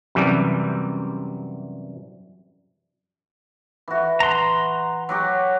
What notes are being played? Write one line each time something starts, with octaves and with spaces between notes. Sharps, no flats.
F#2 C3 E3 G3
E3 F#4
A#5 C6
F#3 F#4 G4